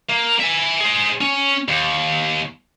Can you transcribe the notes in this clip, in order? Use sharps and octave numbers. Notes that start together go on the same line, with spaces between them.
A#3
E5 G#5
G#4 C5
C#4
D#2